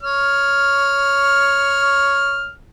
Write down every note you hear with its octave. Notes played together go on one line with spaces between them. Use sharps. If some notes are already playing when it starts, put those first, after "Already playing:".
C#5 F6